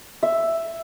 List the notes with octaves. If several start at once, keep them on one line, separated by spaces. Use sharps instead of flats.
E5